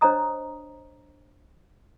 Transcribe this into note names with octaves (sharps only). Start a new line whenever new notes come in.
D4 C5 C#5 D#5 A#5 D#6